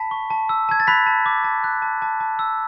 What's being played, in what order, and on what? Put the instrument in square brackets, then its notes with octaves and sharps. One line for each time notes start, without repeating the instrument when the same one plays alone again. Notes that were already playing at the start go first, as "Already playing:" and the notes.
Already playing: [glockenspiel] A5 B5 B6
C#6
A5
E6
A5 G#6
A6
B5 F#6 B6
A5
D6
A5
F#6
A5
A5
A5
E6